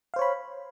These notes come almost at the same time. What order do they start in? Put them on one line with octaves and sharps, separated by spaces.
F5 C5 C#5 B5